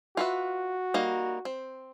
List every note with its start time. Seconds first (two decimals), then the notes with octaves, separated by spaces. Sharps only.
0.17 F4 F#4 B4 E5
0.94 G3 A#3 D#4
1.45 C4